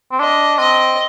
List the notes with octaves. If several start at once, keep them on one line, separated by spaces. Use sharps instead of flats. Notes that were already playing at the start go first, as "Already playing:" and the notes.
C4
D4 D#5
C4 D#5